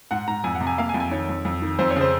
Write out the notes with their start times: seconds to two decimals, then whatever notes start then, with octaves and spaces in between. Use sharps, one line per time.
0.11 G#2 F#5
0.27 G#2 A#5
0.44 F2 G#5
0.55 F#5
0.61 C3
0.67 G#5
0.78 A#3 F5
0.89 G#5
0.94 F2
1.00 G#5
1.11 D#3 C#5
1.29 F2
1.45 F2
1.62 D#3
1.79 F2 C5
1.91 C#5
1.96 C#3
2.01 C5